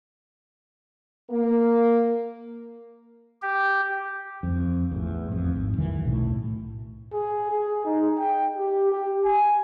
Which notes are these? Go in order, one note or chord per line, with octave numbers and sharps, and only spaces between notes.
A#3
G4
F2
A1 E2
F2
G#1
E2 D#3 E3 F#3
B1 A2
G#4
G#4
D#4
G5
G4
G4
G#5